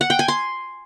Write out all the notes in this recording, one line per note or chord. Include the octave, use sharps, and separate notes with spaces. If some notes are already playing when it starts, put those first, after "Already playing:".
F#5
G5
G#5
C6